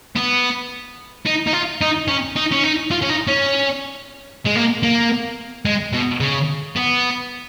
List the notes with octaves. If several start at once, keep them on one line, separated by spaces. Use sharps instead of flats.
B3
D#4
D#4
F4
D#4
C#4
D#4
C#4
D#4
F4
C#4
D#4
C#4
G#3
A#3
A#3
G#3
B2
C#3
B3